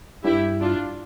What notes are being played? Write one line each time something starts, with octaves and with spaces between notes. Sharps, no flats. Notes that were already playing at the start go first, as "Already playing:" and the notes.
G2 E4 G4
D4 F4